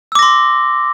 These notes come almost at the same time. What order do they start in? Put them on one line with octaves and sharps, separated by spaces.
E6 D6 A#6 C6